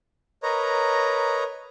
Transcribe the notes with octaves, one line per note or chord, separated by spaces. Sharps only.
A#4 B4 C#5 D#5 A#5